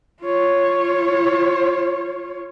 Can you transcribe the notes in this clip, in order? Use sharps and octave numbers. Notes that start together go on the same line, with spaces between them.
F4 C#5